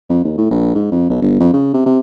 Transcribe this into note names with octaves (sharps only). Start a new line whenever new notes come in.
F2
D#2
A2
A#1
G#2
F2
B1
G1
F2
C#3
C3
C3